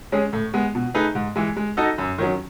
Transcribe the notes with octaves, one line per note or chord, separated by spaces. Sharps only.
G#3 C#4 G#4
A2
G#3 B3
B2
A3 D#4 G#4 B4
G#2
E3 G#3
G#3
D#4 F#4 A4 D#5
F#2
D#3 F#3 C#4